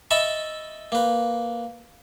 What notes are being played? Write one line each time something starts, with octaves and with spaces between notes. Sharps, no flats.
D#5 E5 A5 B5 C#6
A#3 B4